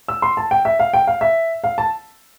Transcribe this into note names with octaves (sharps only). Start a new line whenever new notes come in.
E6
C6
A5
G5
E5
F5
G5
F5
E5
F5
A5